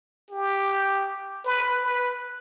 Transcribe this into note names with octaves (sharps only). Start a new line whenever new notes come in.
G4
B4
B4